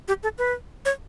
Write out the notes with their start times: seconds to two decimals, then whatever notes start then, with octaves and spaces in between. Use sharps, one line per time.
0.08 G4
0.23 A4
0.38 B4
0.85 C#5